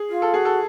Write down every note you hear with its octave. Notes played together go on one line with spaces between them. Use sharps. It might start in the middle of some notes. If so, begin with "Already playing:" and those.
Already playing: G#4
F4
A4
F#4 G#4
A4